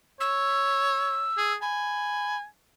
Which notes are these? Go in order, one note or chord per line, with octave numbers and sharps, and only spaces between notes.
C#5 E6
G#4
G#5 B5